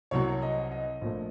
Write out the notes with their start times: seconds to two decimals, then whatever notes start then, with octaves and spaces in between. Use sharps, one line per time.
0.11 C2 C3 F#3 C#5
0.42 D#5
0.71 D#5
1.01 A#1 A#2 A3